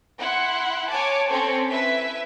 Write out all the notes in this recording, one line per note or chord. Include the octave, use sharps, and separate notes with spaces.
E4 F#5 C6
C#5 G#5 A5 D6
C4 C#4 A4 C5 C#5
E4 B4 E5 B6